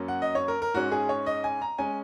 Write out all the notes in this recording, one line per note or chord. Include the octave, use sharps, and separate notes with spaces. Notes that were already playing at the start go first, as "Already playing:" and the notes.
Already playing: F#2 F#3 A#3 C#4
F#5
D#5
C#5
A#4
A#4
G#2 G#3 C#4 F#4
G#4
C#5
D#5
G#5
A#5
G#3 C#4 G#5